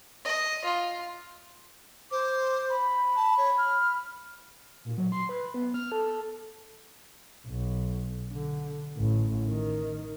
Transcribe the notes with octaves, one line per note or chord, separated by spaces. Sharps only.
D#5
F4
C5 D6
B5
A5
C#5
F6
A#2
F#3
C6
B4
B3
F6
A4
B1
D3
A1
D#3